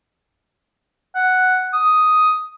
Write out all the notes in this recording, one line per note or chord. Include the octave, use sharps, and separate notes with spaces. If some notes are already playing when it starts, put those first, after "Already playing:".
F#5
D#6